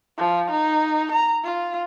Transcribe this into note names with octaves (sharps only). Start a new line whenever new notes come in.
F3
D#4
A#5
F4